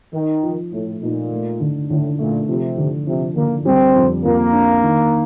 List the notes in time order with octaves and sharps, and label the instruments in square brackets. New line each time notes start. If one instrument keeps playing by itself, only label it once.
[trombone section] D#3 [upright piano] D#4
[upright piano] F3
[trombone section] A2 [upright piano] A3
[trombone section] A#2 [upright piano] D#4
[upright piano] A3
D3
[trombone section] A2 [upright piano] D3
[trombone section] A#2 [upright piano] A3
[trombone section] C3 [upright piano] F3
[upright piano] D3
[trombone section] C3 [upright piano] F3
[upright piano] D3 [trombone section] A#3
[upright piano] G3 [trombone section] C4
[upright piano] F2
[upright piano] F2 [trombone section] A#3
[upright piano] D4
D#3